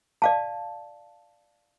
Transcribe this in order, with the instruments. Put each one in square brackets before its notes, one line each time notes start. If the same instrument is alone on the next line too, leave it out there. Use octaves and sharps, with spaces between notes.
[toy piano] D5 F5 A5